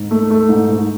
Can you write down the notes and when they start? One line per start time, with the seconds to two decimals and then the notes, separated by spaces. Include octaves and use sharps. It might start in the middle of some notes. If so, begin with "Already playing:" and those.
Already playing: G#2
0.11 A3
0.30 A3
0.49 G#2
0.68 G#2